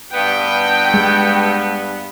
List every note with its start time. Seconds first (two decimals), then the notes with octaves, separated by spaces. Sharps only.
0.13 G2 B3 G5
0.94 G#3